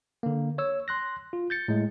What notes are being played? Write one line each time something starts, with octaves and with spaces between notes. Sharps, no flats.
D3 A#3
C#5 E6
C6 F#6 A#6
F4
G6 A6 C#7
A2 G#3